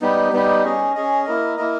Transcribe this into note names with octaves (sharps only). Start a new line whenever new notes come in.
G3 B3 D#4 G4
G3 B3 D#4 G4
C#4 G#4 D#5
C#4 G#4 D#5
A#3 E4 A#4 D#5
A#3 E4 A#4 D#5